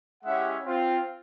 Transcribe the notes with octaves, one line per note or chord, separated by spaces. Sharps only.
G#3 C#4 E4 G4 E5 F#5
C4 F4